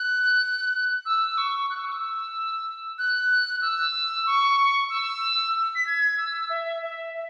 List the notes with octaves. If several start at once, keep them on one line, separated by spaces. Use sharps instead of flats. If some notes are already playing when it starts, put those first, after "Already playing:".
Already playing: F#6
E6
C#6
F#6
E6
C#6
E6
F#6
E6
C#6
E6
B6
G#6
E6
E5
E5
E5